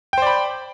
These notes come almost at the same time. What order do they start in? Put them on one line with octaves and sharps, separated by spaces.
G5 C5 D5 B5